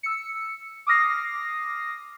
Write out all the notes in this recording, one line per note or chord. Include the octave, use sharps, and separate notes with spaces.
E6 C#7
D6 D#6 F6 A#6 C7